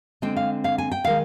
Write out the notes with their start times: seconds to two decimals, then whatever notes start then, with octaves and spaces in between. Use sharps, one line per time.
0.22 D3 G#3 C4 G5
0.36 F5
0.64 F5
0.78 G#5
0.92 G5
1.05 D#3 G#3 F5